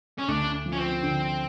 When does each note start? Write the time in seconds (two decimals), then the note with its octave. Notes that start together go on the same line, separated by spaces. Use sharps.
0.18 C#4
0.28 D2 D4
0.66 F3
0.72 C#4
0.78 C4
1.03 D3